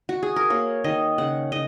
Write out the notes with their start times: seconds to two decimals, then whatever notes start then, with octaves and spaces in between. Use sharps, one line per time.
0.09 F#4
0.23 G#4
0.36 A#4
0.50 A#3 C#5
0.84 D#3 D#5
1.18 C#3 F#5
1.52 C#3 D#5